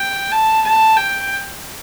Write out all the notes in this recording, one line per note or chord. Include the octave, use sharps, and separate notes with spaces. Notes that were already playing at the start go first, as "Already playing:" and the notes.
Already playing: G5
A5
A5
G5